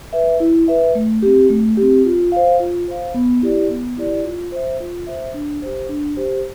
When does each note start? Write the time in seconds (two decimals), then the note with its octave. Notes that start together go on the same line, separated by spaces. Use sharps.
0.13 B4 E5
0.40 E4
0.68 B4 E5
0.95 A3
1.22 C4 G4
1.50 A3
1.77 G4
1.82 C4
2.05 F4
2.32 C5 F5
2.60 F4
2.88 C5 F5
3.14 B3
3.42 E4 G4 D5
3.69 B3
3.97 E4 G4 D5
4.24 F4
4.52 C5 E5
4.80 F4
5.07 C5 E5
5.34 D4
5.62 G4 C5
5.89 D4
6.17 G4 C5